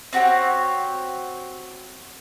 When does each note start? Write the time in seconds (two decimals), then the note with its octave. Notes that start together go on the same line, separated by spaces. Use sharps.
0.13 C4 F#4 G4 C#5